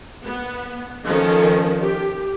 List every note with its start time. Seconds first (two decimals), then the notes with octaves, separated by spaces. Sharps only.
0.23 B3
1.04 D#3 F3 C#4 A4
1.81 G4